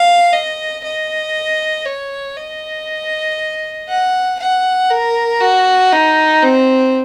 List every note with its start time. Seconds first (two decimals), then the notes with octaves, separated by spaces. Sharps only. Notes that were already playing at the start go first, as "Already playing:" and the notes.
Already playing: F5
0.33 D#5
0.84 D#5
1.85 C#5
2.37 D#5
3.89 F#5
4.39 F#5
4.90 A#4
5.41 F#4
5.92 D#4
6.43 C4